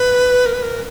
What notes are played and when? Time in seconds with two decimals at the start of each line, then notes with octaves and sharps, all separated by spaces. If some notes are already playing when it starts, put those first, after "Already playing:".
Already playing: B4
0.46 A#4
0.54 B4
0.62 A#4